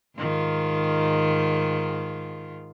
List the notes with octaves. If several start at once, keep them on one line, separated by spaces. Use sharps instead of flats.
G#2 D#3 F4